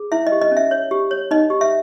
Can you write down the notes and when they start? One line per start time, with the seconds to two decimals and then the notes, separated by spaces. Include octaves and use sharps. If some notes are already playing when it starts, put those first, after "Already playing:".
Already playing: G#4
0.12 E4 E5
0.27 D#5
0.32 G4
0.42 D#5
0.52 C#4 E5
0.71 C#5
0.91 G4
1.11 C#5
1.31 D#4 D#5
1.50 G4
1.61 E5